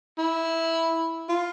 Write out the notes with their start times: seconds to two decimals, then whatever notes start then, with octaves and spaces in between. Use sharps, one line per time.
0.18 E4
1.29 F4